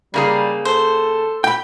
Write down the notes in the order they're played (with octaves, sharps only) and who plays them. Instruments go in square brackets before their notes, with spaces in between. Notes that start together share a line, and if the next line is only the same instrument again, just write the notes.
[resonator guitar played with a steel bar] C#3 A#3 G#4 [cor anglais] G3
[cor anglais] A4 [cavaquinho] C5
[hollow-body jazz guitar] G5 B5